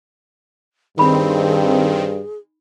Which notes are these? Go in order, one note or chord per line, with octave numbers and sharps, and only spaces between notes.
G2 D#3 C4 D#4 G#4 B5